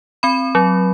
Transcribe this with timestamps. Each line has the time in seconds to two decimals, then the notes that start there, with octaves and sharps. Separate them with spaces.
0.23 C4 B5
0.55 F#3